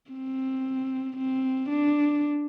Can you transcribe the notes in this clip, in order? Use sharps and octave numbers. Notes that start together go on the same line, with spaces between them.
C4
C4
D4